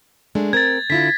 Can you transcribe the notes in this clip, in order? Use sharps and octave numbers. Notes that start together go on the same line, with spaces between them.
G#3 A3 D4
C4 A#4 G#6 A6
D3 E4 F4 B6